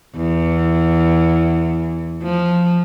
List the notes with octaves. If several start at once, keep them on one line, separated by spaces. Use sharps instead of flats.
E2
F3